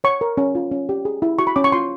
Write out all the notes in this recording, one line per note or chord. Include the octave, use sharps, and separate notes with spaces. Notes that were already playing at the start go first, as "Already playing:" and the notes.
C#5 C#6
A#4
C#4
F4
C#4
G4
G#4
E4
F#4 C#6
B5
C#4 D6
C#6
F4 C6